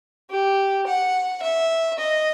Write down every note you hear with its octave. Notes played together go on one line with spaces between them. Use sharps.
G4
F#5
E5
D#5